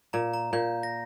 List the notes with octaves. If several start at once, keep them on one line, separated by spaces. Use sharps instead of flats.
A#2 A#5
A#5
A#2 G6
A#6